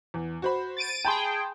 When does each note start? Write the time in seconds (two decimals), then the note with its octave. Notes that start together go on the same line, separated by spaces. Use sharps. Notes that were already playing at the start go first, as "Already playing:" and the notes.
0.14 E2
0.42 F#4 C5 B5
0.77 A6 D7 D#7
1.05 G#4 G5 A5 B5 C6